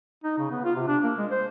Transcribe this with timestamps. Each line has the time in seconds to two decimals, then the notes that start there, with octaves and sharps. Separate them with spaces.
0.24 D#4
0.38 C#3
0.51 B3
0.64 F4
0.75 C3
0.87 D4
1.03 A#3
1.18 G#3
1.31 C5